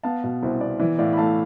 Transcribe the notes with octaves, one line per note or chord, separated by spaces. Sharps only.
B3 F5 A5
B2
C2 C5
B3 D5
E3 D5
A2 D5 F5
B5
A3 F5 A5